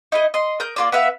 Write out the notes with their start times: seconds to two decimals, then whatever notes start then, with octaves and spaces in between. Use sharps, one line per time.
0.12 D#4 E4 D#5
0.34 D#5 C6
0.60 A#4 D#6 G6
0.76 A#3 F4 D5
0.92 B3 B4 E5 F5